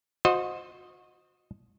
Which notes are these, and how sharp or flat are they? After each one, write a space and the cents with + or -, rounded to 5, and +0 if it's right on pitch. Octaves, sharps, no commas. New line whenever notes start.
F#4 -35 C5 +0 D#5 +0